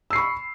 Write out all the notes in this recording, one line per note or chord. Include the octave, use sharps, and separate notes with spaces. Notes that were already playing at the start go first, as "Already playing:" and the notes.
B5 C#6 E6 C7